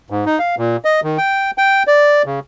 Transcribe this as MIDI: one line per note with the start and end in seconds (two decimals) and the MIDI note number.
0.10 0.25 44
0.26 0.39 63
0.39 0.55 77
0.58 0.77 46
0.85 1.00 75
1.03 1.18 51
1.18 1.51 79
1.58 1.83 79
1.87 2.22 74
2.26 2.39 49